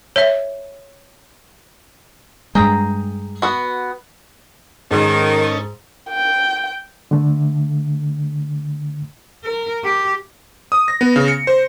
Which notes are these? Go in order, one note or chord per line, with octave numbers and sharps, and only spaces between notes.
C#5 E5
G2 G#3 G#4 G5 A#5
B3 F#4
G#2 D#3 G#3 C#4 D#4 A4
G5
D3 A3
A#4
G4
D#6
A#6
B3
C#3
C#7
C5